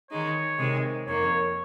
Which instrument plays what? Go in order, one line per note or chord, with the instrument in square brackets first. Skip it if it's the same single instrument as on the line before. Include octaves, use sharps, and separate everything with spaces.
[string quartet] D#3 G#3 D#4 [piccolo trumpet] C#5
[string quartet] C3 D#3 G#3
[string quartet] F2 D#3 A#3 [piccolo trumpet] C#5